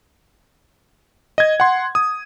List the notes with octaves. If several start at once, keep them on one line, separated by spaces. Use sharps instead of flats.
D#5 G#6
F#5 C6
D#6